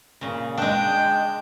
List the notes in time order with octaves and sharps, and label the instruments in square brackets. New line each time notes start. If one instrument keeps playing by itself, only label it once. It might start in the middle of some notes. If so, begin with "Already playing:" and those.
[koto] A#2 C#3
[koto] G#3 D4 [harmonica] G5